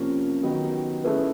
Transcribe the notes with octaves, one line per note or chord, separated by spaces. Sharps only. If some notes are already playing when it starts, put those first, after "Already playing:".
Already playing: C3 F3 A#3 C#4
D#3 F#3 B3 D#4 G4
A3 C#4 E4 G#4 B4